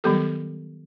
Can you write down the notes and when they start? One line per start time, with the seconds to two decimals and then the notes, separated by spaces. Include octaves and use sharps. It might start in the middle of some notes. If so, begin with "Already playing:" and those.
0.04 D#3 F#3 G3 B3 G4 A4